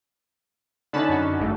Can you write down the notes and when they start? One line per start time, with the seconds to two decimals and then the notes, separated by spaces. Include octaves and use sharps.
0.93 D3 C#4 D#4 A5 B5
1.09 F#2 F#4
1.39 G1 G#2 A3